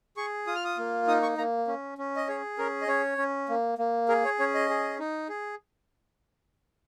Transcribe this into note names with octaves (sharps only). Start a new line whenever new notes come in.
G#4 C#6
F4 D#6
F6
D#6
A#3
D#4 D#6
C#6
A#3 A#5
C#4
C#4
D#5
G#4 C#5
C#4 A#4
D#5
C#4 C#5
C#4
A#3
A#3
G#4 A#4
C#5
C#4 C#5
D#5
G#4
D#4
G#4